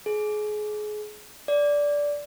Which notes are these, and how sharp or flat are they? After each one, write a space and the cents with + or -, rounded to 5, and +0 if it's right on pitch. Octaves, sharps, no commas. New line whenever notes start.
G#4 +30
D5 -10